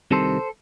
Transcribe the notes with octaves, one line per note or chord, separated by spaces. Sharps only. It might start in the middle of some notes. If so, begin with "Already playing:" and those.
C2 C3 D#3 A4 C5